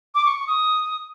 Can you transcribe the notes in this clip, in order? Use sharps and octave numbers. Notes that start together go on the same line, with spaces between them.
D6
C#6
C#6
D#6